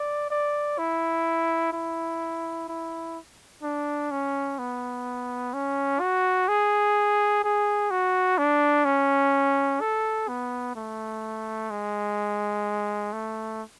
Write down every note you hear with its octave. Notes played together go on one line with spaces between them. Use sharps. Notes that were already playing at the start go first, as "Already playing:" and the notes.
Already playing: D5
D5
E4
E4
E4
D4
C#4
B3
C#4
F#4
G#4
G#4
F#4
D4
C#4
A4
B3
A3
G#3
A3